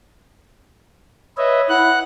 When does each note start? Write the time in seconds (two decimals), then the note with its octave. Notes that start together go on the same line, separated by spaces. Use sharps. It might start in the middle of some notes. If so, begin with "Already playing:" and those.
1.38 B4 C#5 D#5 E5
1.69 E4 F#5 F#6